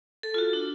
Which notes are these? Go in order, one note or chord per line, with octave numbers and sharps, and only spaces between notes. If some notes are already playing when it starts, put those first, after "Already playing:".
A4
F4
F#4
D4